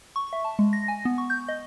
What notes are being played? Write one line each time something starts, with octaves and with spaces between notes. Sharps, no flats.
C#6
E5
A5
G#3
A#6
G#5
B3
C#6
G6
D#5